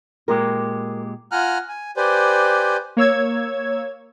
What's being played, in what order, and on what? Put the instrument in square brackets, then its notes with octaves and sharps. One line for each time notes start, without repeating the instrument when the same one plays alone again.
[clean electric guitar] A#2 G#3 G4 [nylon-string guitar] A#4
[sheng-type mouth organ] F4 F#5 G#5 A#5 F6 F#6
G#5
G4 B4 C5 D5 G#5
[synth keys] A#3 C#5 E6 G#6